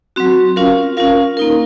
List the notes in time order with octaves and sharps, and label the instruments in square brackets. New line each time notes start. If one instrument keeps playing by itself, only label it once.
[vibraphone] F#3 C4 F#4
C#4 F4 A#4 F5
C#4 F4 A#4 F5
A#3 D#4 A#4